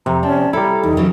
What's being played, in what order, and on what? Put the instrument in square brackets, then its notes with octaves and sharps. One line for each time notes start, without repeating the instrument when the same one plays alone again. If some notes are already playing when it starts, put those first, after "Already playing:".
[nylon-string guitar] F2 [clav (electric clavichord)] C3 [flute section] A#5
[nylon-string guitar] C4 [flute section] C#4 D5 A5
[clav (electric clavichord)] G3 E4 [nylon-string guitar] A4 [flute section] A#5
[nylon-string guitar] E2 [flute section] D#4 G4
[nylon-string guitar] C#3 E3 F#3